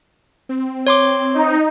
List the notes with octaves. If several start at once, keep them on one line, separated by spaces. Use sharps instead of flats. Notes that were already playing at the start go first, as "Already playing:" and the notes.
C4
C#5 C6 D6
D#4